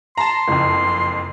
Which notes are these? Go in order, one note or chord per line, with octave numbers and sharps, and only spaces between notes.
A5 A#5 C6
F#1 F2